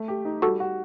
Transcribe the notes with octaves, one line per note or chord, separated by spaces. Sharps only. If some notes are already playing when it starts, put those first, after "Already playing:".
Already playing: A3
G4
D#4
G3 F#4 A4
F#4